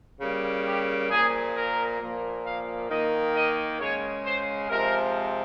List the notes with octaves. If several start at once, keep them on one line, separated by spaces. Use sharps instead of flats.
C#3 G3 A#3
G4
A#2 F3 A#3 G#4
A#4
A#2 F3 A#3
F5
D#3 A#3 D#5
D#5
C#3 G#3 C#5
C5
C3 F3 G#3 A#4